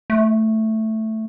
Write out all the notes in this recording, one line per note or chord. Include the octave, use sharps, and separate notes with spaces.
A3